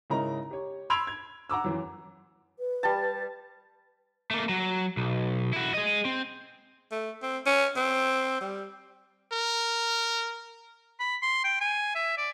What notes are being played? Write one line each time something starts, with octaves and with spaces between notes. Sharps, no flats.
G#2 C#3 D#4 E4 A#4 A#5
G4 C#5
B5 C6 E6 G#6 D7 F7
G#6
F#5 A#5 D6 E6
F#2 E3
B4
G3 A5
A3 A#3
F#3
B1
E4 F#4
G#4 D#5
C4
A3
C4
C#4
C4
G3
A#4
B5
C6
G5
G#5
E5
D5